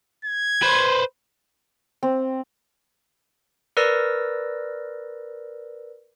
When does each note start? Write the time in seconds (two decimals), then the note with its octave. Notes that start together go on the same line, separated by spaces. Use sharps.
0.25 G#6
0.62 B4 C5
2.03 C4
3.77 A#4 B4 D5 E6 A#6